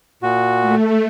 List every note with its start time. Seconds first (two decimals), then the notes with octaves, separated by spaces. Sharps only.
0.23 A#2 F#4
0.61 A3